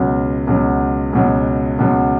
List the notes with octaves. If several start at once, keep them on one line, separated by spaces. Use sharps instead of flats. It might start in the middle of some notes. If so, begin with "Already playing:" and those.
Already playing: C#2 B2 F#3
C#2 B2 F#3
C#2 B2 F#3
C#2 B2 F#3